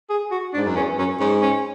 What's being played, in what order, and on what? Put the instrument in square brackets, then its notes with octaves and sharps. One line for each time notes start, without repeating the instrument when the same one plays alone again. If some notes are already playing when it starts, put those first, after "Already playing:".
[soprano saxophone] G#4
F#4
D4
[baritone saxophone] G#2
F#2
[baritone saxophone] E2 [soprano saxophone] C#4
[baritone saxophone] F#2 [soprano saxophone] C#4
[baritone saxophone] G#2 [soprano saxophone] C#4
[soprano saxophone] C#4